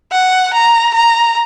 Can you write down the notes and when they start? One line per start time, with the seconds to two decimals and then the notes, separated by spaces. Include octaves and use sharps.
0.12 F#5
0.53 A#5
0.94 A#5